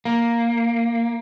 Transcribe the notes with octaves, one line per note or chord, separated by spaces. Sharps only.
A#3